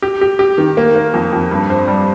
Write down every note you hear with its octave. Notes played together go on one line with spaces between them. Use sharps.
G4
G4
G4
D#3
A#3
A#3
F2
F2
G2
C5
G3